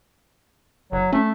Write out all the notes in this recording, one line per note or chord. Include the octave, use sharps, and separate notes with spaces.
F#1 F#3
A3 C#4